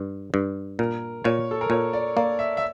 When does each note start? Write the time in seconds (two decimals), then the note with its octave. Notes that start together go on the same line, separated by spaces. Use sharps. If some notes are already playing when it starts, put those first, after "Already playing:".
Already playing: G2
0.34 G2
0.79 A#2 A#4
1.24 A#2 C#5
1.51 A4
1.61 A#4
1.70 A#2 C#5
1.93 D5
2.17 A#3 D5
2.39 E5
2.57 E5